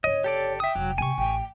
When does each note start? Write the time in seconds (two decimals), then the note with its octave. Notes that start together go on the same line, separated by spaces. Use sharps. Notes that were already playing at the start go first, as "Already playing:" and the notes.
0.04 G1 C#3 C#5 D#5
0.24 G4 A4 D5
0.60 E5 G5 D#6
0.75 F1 F#3
0.98 C3 A#3 G#5 C#6
1.18 A1 G5